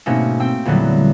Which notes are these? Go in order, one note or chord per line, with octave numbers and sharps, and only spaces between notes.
G#2 B2 A3 A#3 C4 C#4
C4 G5 E6
E2 A#2 D3 F#3 G3